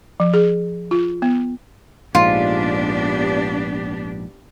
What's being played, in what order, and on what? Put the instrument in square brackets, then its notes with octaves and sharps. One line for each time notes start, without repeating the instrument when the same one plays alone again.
[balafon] F3
G#4
F4
B3
[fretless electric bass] A#1 G#2 [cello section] B3 D4 G4 [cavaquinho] F4